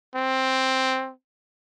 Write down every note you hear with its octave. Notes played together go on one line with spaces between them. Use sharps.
C4